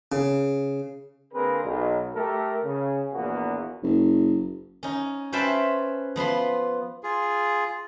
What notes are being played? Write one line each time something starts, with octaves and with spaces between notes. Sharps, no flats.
C#3
D3 A#3 C4 G#4 A#4 B4
B1
A3 G4 A4 A#4
C#3
A#1 E2 A#2 A#3 B3 F#4
F#1
C#4 D#4
C#4 B4 C5 E5 G5 A5
F3 B3 B4 C6
F4 G#4